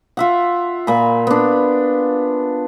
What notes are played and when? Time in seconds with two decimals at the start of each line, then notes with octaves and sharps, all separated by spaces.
0.17 F4 E5 F#5
0.87 A#2 G#5 B5
1.27 B3 D4